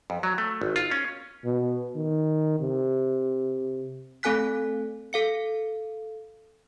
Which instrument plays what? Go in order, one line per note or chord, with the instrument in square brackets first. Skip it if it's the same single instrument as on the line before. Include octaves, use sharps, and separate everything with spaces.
[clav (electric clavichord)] F2
F#3
A3
G#1
F4
C#4
[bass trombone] B2
D#3
C3
[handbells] A3 C4 A4 G#5 F#6 B6
A4 F5 C#7